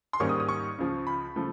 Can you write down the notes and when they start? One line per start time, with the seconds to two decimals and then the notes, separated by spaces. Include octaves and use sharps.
0.13 C6
0.20 G#2 D#3 G3 A#3 C#4 C#6
0.29 D#6
0.40 D#6
0.49 C#6
0.78 C#2 C#3 F3
1.07 B5
1.36 C#3 F3 A3